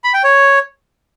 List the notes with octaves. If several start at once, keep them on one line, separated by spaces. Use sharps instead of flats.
B5
G5
C#5